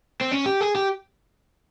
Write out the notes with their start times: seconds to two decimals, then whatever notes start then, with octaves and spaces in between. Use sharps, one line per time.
0.21 C4
0.31 C#4
0.46 G4
0.61 G#4
0.75 G4